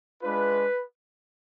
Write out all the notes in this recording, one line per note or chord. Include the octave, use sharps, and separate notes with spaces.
G#3 D4 F4 B4